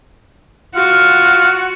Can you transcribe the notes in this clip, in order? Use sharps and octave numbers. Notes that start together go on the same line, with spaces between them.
F4 F#4